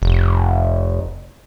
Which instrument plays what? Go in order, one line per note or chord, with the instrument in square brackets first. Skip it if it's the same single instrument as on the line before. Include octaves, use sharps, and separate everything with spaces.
[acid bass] F1